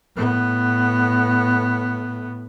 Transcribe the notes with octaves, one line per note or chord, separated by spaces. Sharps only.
A2 B3